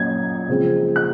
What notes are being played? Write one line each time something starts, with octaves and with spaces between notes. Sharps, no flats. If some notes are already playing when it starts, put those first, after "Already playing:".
Already playing: A#2 F#3 C#4 G#6
C#3 F3 G#3 C4
F#6